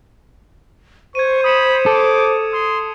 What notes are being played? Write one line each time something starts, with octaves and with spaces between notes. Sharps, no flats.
C5 C#6 G#6 D#7
B5 D#6 C#7 E7
A4 D6
C6 D#6